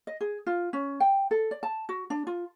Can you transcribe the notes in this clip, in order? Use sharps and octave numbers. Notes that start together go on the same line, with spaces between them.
D#5
G#4
F4
C#4
G5
A4
D5
A5
F#4
D4
F4